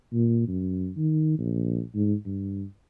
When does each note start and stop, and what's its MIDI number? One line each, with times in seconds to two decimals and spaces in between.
0.13 0.47 46
0.48 0.90 42
0.97 1.35 51
1.39 1.81 34
1.95 2.14 44
2.26 2.64 43